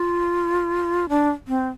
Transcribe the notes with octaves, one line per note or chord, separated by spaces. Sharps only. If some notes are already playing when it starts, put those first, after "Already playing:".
Already playing: F4
D4
C4